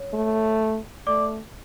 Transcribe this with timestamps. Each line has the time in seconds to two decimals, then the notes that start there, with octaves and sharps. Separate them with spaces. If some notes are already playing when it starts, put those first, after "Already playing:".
Already playing: C#5
0.14 A3
1.07 A3 D5 D6